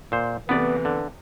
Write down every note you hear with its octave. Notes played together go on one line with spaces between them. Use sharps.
A#2 C5
E2 C3 E3 A3 B3 D5
D3